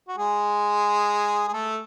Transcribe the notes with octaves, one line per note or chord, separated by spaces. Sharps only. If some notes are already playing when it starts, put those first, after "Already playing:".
F#4
G#3 G#4
G#4
A3 A4